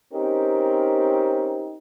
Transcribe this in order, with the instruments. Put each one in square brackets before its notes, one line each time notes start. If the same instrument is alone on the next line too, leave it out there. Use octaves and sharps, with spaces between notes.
[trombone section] C4 C#4 D#4 G4 A#4